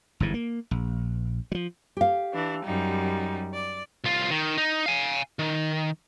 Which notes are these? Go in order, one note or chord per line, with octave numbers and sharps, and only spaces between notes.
G1 G#2 E3
A#3
A#1
F3 F#3
G4 F5
E3 D4
F#2 G3 D#4
D5
C2 F4
D#3
D#4
F5 G#5
D#3